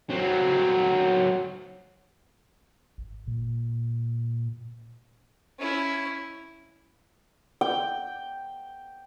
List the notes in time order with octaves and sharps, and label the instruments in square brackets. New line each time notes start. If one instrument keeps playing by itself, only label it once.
[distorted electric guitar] F#3 C4
[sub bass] G#1
A#2
[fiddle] C#4 E4
[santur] G5